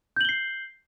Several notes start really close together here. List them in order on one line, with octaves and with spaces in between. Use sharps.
G6 F#7 G7 C7